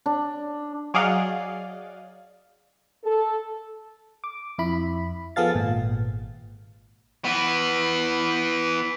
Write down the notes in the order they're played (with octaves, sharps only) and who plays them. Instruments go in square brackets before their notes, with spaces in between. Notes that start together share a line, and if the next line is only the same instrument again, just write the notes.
[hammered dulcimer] D4
[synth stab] F#3 G#4 D5 D#5 F5 F#5
[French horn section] A4
[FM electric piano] D6
F2 E4 B5
F3 B3 G#4 A4 F5 A6
G#1 A#2
[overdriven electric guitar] E3 B3